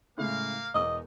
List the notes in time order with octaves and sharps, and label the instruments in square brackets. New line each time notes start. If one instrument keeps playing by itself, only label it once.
[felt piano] A2 C#3 G#3 [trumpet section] A#3 F5
[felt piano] E1 E2 D#6 [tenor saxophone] D#5